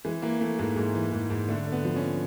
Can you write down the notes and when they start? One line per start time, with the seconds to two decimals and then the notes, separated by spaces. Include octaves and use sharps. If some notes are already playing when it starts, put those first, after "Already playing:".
0.05 E3 G#3
0.22 E3 A#3
0.41 E3 A3
0.59 G#2 G#3
0.76 G#2
0.95 E3
1.13 G#2
1.30 G#2
1.48 D3 A3
1.67 D3
1.72 B3
1.85 F3
1.96 C#4